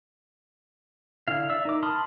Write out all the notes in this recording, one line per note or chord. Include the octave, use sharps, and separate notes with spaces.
D3 E4 F5
D5 E5 E6
D#4 A#4 D6
A5 B5 C6 D#6 F6